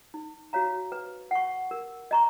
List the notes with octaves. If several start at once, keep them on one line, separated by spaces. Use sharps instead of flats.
D#4
F#4 C#5 F5 A#5
B4
F#5 C#6
A#4
D#5 A#5 C#6